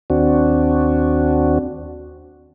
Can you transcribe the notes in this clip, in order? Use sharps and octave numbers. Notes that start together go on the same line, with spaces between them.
D#2 C4 D4 F#4